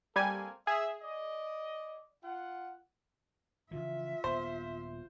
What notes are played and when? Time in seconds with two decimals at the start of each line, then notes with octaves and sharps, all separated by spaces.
0.16 G3 A#3 C4 A4 G#5
0.67 G#4 E5
1.02 D5 D#5
2.23 F4 F#5
3.71 C#3 E3 F3 F4 E5
4.24 D#1 B3 C5